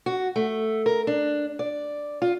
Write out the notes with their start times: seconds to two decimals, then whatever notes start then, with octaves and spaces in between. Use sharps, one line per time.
0.06 F#4
0.36 A3
0.86 A#4
1.07 D4
1.59 D5
2.22 F4